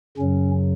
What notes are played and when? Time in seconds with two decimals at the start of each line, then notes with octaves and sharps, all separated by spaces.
0.18 F#2 C#3 F#3 C#4